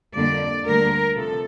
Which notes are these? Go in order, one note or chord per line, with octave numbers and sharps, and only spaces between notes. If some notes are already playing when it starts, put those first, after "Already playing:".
F2 D3 G3 A#3 D5
D2 D3 G3 A#3 A#4
C3 F3 A4